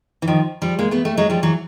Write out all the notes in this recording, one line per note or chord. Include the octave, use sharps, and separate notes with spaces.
E3
D#3 F3
F3 G3
G#3 A#3
A3 B3
G3 A3
F#3 G#3
F3 G3
E3 F#3